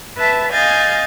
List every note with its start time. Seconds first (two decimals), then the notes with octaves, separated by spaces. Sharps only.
0.18 B4 E5 A5
0.52 D#5 F5 G#5 G6 A6